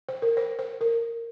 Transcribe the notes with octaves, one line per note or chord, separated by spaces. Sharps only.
C5
A#4
C5
C5
A#4